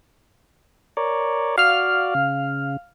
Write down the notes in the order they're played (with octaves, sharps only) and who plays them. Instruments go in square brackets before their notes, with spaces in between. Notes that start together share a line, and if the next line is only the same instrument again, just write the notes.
[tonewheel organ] A#4 C#5 D5
[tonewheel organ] F#4 D5 [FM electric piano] F5 F6
[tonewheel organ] C#3